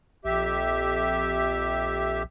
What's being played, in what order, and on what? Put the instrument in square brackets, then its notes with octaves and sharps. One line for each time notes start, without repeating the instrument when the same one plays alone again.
[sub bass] A#1 [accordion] F2 G4 E5